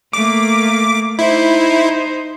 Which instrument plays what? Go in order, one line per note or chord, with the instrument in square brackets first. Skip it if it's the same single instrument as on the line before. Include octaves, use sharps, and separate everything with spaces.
[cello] A3 A#3 [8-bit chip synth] D6
[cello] D#4 C5 [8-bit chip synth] E4